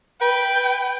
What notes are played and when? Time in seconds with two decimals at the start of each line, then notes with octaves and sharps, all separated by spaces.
0.21 B4 G5